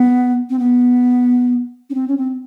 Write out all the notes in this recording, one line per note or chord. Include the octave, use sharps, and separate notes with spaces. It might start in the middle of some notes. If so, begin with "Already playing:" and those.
Already playing: B3
C4
B3
C#4
C4
C#4
C4